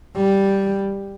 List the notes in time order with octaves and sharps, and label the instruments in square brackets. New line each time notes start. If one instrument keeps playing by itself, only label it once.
[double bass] G3